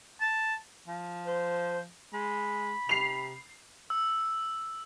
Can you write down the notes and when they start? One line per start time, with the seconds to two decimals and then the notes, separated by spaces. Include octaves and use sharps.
0.21 A5
0.88 F3
1.27 C5
2.13 G#3 B5
2.89 C3 C7 F7
3.90 E6